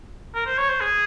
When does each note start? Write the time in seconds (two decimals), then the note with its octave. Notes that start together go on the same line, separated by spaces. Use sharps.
0.35 A#4
0.46 C5
0.58 C#5
0.69 C5
0.81 G#4